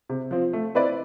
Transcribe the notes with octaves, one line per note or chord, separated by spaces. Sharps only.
C3
F3 C4
A3
C4 E4 B4 D5